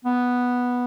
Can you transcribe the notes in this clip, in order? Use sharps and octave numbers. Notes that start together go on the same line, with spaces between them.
B3